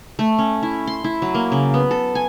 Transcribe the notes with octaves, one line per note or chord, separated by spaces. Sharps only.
A3
C#4
E4
C6
E4
F#3
A#3
C#3
B3
A4
G#5